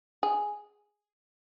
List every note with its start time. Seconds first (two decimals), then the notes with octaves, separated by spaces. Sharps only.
0.23 G#4